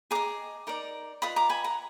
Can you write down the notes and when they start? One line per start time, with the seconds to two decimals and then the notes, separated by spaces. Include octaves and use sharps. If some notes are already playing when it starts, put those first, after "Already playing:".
0.11 G#4 D#5 A#5 D6
0.67 D#4 A#4 D5
1.22 F4 B4 D#5 B5 D#6
1.36 A#5 D6
1.49 G#5 B5
1.64 F#5 A#5